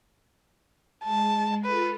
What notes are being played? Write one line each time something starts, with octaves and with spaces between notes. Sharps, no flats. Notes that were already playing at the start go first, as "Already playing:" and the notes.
G#3 A5
F4 A4 B4